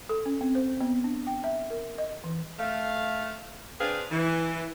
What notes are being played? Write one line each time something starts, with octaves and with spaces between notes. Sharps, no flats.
A4
C#4
C4
C5
B3
D4
G5
E5
A#4
D#5
E3
A3 F5
C4 D4 G#4 B4 C5 F5
E3